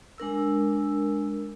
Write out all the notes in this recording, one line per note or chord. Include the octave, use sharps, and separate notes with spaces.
G#3 D4 A#4 E6